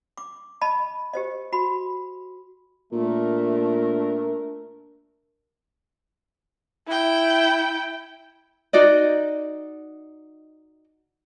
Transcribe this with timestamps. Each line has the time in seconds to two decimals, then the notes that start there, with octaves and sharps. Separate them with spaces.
0.17 D6
0.61 D#5 A5 B5
1.13 G4 C5 D#5
1.52 F#4 B5
2.93 A#2 A3 D4 A#4
6.87 E4 G5
8.73 D#4 F#4 D5 D#5